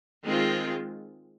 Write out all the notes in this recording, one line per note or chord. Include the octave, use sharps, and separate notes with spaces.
D#3 G#3 C4 F4